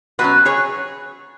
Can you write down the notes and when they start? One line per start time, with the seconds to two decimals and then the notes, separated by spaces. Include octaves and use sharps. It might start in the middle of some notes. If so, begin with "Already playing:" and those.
0.19 B2 F#3 C#4 F#4 B4
0.45 G#4 C#5